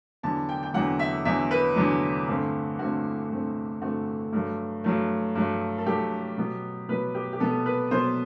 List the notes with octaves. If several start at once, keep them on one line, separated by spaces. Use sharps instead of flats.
E2 D3 F#3 A5
G5
G5
E2 D3 F#3 F#5
E5
E2 D3 F#3 E5
B4
E2 D3 F#3
G2 D3 A3 C4
G2 D3 A3 C4 F#4
G2 D3 A3 C4
G2 D3 A3 C4 F#4
G2 F#3 A3
G2 F#3 A3
G2 F#3 A3
A4
G2 F#3 A3 G4
B2 F#3 B3
B2 F#3 B3 B4
G4
G4
B2 F#3 B3 A4
B4
B2 F#3 B3 C5